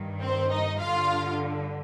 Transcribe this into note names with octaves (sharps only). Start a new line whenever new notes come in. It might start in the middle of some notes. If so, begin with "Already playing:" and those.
Already playing: G2 D#3
C4 C5
D#4 D#5
G2 D3 F4 F5